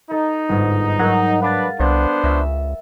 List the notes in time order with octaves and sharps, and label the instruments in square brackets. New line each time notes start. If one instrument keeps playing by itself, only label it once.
[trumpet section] D#4 [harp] A4
[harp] G1 G#2
[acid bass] F#3 [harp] A#4 F#5
[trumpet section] D4 B4 [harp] F5 A6
[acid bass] C2 [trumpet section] B3 D4 C5
[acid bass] C#2 [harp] E5